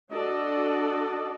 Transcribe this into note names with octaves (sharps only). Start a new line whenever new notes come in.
D4 F#4 A4 D5 D#5